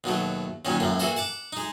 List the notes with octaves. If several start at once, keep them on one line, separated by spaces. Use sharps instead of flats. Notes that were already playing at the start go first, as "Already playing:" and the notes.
D#2 B2 F#3 A3
D#2 A#2 D#3 F#3 C#4
C#2 F#2 A2 A#3
E3 A#3 F#4 A4 A#4
F#5 A5 D6
G#3 D#4